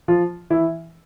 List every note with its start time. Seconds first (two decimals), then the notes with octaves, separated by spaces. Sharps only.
0.08 F3 F4
0.50 E3 E4